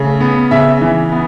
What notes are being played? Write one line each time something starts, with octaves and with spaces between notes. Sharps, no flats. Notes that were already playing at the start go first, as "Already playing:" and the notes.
Already playing: C#3 A3
B3
C#3 E5
E3
B3